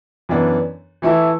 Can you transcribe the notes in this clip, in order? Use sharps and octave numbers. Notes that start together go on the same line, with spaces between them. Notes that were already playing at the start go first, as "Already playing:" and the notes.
F#2 E3 B3 D4
E3 A3 E4 A4